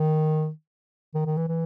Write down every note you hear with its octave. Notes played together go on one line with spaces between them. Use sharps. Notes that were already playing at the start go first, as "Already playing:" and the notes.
Already playing: D#3
D#3
D#3
E3
E3